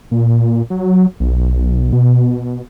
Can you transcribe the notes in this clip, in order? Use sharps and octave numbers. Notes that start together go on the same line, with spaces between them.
A#2
F#3
B1
B2